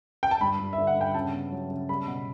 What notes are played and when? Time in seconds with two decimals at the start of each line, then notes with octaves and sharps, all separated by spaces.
0.23 G5
0.31 A5
0.41 G2 B5
0.59 G2
0.73 E5
0.78 D3
0.87 F#5
0.96 G2 G5
1.14 C#3 A5
1.33 B3
1.52 F#3
1.71 C#3
1.89 G3 B5
2.07 B2